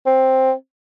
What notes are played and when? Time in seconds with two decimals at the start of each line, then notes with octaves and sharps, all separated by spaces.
0.06 C4